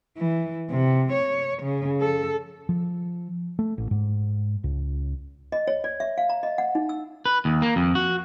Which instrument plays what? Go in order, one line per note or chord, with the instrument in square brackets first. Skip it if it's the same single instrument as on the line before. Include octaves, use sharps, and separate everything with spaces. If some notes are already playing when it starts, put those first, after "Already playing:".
[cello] E3
C3
C#5
C#3
A4
[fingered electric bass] F3
A3
A1
G#2
C#2
[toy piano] D#5
C#5
D5
E5
F5
A#5
D#5
F#5
D#4
E6
[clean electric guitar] B4
D#2
A#3
F2
F#4